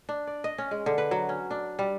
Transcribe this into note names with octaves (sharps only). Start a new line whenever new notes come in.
D4
D5
D#5
C#4
G#3
D3
B4
F#3
C#4
D4
G3